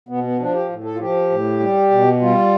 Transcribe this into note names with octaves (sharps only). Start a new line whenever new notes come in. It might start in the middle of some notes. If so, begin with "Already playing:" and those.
B2 B3
B3
F3 D4
G4
A2
A4
F4
F3 G4
A2
G3
B2
G3 F4